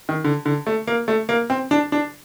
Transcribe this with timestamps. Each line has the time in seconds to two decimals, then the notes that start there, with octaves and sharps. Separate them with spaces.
0.09 D#3
0.24 D3
0.46 D3
0.67 A3
0.87 A#3
1.08 A3
1.29 A#3
1.50 C4
1.71 D4
1.92 D4